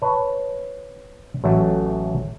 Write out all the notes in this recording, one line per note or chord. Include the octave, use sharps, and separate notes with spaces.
B4 C#5 A5
A1 F#3 A3